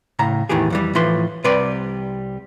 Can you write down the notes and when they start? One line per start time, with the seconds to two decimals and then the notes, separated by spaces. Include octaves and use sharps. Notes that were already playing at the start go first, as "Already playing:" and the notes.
0.19 A2 C#3 A#5
0.49 E2 A2 D#3 E3 G4 G#4
0.70 F2 E3 G3
0.95 A2 E3 F3 B4 C6
1.44 C2 C3 G3 B4 D5 C6